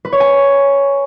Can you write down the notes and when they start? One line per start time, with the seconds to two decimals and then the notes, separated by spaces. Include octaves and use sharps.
0.05 B4
0.12 C#5
0.20 G#5